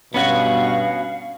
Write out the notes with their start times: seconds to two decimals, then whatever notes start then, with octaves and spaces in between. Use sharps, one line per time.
0.14 G2 B2 B3 C#4 F#4 F5